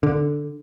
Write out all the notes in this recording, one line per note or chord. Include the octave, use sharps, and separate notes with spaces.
D3